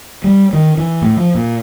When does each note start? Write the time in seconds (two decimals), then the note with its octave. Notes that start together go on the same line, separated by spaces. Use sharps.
0.24 G3
0.53 D#3
0.78 E3
1.02 A2
1.17 F3
1.35 A#2